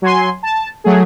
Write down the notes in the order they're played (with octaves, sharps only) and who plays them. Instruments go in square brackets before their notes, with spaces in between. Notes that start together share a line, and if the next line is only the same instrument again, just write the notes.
[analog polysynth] F#3 G#5 C6
A5
F#3 A3 G#4